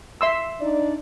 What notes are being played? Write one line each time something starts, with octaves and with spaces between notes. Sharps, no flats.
E5 C6 E6
D4 D#4 D5